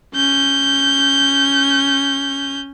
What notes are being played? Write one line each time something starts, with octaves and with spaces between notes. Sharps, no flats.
C#4 G6